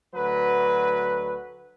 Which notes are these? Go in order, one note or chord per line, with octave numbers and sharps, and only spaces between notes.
D2 F#3 B4